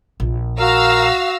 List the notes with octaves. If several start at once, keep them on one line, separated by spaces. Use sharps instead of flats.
A#1
F#4 A#4 F5 E6 A#6